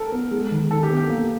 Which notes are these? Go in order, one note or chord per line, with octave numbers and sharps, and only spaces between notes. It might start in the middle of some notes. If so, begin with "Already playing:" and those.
Already playing: A4 A#4
B3
G#3
D#3
D#3 A4
G4
B3
G4
A#3